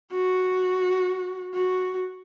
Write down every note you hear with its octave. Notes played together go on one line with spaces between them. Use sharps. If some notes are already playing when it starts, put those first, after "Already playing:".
F#4
F#4